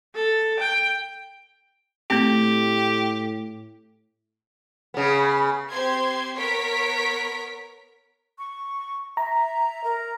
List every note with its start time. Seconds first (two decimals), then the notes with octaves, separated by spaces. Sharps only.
0.14 A4
0.59 G5
2.11 A2 A3 C4 G4
4.94 C#3 B3
5.71 C4 G4 C5 C6 G#6
6.36 B3 A#4 C#5 B6 D7
8.38 C#6
9.17 E5 A#5
9.84 A#4